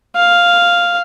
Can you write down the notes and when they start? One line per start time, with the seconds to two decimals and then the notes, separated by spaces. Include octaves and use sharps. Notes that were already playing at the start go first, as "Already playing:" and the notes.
0.16 F5